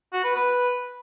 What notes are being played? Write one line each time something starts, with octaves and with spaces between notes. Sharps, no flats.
F#4
B4
B4